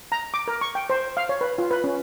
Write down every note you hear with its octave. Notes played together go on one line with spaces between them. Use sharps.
A#5
D6
A#4
C#6
G5
C5
F5
C#5
B4
F4
B4
C#4